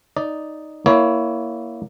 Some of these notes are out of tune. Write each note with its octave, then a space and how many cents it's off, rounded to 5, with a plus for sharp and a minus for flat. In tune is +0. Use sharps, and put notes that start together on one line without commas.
D#4 +0 D5 -5
A#3 +10 E4 +0 C#5 +20